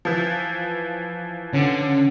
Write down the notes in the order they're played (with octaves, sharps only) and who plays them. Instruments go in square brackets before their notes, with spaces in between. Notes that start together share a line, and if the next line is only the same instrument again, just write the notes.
[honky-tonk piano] E3 F3
[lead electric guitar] D3 [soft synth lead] C#4